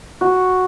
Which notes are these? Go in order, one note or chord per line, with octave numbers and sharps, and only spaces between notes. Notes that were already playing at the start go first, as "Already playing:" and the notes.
F#4